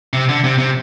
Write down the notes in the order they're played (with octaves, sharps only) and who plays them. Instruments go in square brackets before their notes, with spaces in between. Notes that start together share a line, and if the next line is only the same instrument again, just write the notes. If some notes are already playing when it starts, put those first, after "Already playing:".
[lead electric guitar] C3
D3
C3
C3